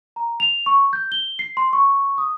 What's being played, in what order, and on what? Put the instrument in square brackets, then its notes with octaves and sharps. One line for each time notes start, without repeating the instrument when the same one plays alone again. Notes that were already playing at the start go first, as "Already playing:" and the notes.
[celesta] A#5
F7
C#6
G6
G7
C7
C6
C#6
D#6